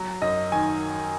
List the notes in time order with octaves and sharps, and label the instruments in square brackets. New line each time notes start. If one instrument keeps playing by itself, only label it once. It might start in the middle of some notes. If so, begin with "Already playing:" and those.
Already playing: [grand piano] F#3
F#2 D#5
D#3 G#5